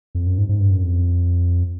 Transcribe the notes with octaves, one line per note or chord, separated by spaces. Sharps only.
F2
F#2
G#2
G#2
G2
F#2
F2